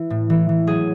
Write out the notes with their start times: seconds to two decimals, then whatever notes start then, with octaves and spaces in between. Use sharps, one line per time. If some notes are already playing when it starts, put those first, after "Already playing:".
Already playing: E3
0.10 A2
0.30 E3
0.49 E3
0.67 F#3 G#4